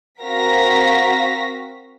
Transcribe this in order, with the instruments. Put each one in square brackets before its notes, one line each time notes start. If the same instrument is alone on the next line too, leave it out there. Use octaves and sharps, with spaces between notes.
[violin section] C4 F#4 A#4 F5 A#6 B6